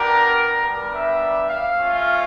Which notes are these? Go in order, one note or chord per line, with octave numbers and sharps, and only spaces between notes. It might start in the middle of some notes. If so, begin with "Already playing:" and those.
Already playing: B3 D4 G4 A#4
G3 B3 D4 G4 A#4
E5
F5
A3 C#4 F4